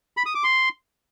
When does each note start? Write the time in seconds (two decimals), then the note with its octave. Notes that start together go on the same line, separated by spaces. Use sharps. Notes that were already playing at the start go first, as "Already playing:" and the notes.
0.17 B5
0.26 D#6
0.35 D6
0.44 C6